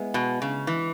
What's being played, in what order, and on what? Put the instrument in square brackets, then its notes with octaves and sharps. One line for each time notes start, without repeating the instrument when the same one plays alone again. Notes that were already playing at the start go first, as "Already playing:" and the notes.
Already playing: [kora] G#3 B3 E4
[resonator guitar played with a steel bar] B2
C#3
E3